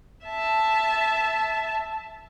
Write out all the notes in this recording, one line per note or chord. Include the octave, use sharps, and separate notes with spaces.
E5 A5